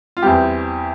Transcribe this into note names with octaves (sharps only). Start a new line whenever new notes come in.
F4
E2 E3 G3 C4 G4